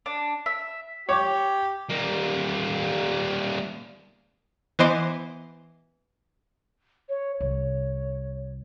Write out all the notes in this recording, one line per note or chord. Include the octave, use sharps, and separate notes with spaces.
D4
E5
G4 C#5 D6
G3 A#3
E3 B3 C5 D#5 C6 D6
C#5
C2 C#5